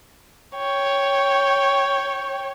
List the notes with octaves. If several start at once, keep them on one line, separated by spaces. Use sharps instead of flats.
C#5 G5